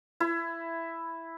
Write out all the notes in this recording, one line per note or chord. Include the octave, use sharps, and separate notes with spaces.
E4